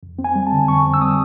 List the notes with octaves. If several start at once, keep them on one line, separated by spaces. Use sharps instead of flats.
F2
C4
G#5
G3
A5
D3
F2 C#6
C4
E6
G3 D#6